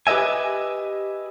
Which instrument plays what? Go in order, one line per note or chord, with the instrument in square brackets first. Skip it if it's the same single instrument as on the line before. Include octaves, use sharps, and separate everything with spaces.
[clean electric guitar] G4 B4 C5 D#5 E5 G#5